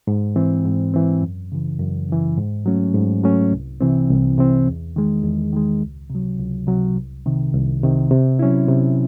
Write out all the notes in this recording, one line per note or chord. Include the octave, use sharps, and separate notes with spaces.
G#2
E3 C4
G#2
E3 C4
F#2
C#3 E3
F#2
C#3 E3
G#2
F#3 A3 C#4
G#2
F#3 A3 C#4
C2
C3 E3 C4
C2
C3 E3 C4
E2
D#3 G#3
E2
D#3 G#3
C#2
C3
F#3
C#2
C3 F#3
C2
C3 D#3
C2
C3 D#3
C3
F#3 C#4 E4
C3